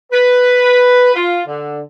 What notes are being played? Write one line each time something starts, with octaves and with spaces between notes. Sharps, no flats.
B4
F4
D3